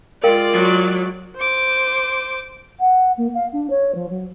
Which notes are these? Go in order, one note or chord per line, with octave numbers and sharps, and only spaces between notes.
G#3 F4 A#4 D5 F5 G5
F#3
C5 D6
F#5
A#3
F5
D4
C#5
F3
F#3